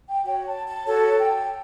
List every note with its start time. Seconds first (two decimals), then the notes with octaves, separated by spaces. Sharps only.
0.09 G5
0.24 F#4 C#5 G5
0.45 A5
0.65 A5
0.86 F#4 A4 C#5 A5
1.18 G5